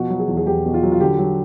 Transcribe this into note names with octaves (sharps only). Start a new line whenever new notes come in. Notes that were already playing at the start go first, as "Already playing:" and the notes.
Already playing: B2 F3 F#4
F#3
G#4
E2
G#4
E2 G4
B2
F4
F#3
F4
D3 G4
F#3